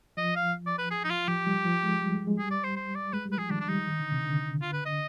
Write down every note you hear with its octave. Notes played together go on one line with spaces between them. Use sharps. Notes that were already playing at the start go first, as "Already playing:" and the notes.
F3 D#5
F5
D5
B4
G#4
D#4
F4
F3 G4
G3
F3
G#3
G3
G#3
G#3
G3 G#4
D5
C5
C5
D5
G#3 B4
G3
B4
F3 G#4
D#3 D4
D4
G3 D#4
D#3
D3
C3
D3
F4
B4
D3 D#5